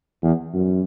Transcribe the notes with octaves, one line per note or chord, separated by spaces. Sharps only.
E2
F#2